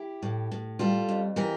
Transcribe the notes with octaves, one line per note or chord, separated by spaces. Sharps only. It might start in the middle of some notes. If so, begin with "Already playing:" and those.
Already playing: E4 G4
A2
A2
G3 F4 A4
F2
E3 G4 A#4